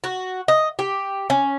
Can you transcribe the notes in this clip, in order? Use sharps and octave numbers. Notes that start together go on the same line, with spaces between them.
F#4
D#5
G4
C#4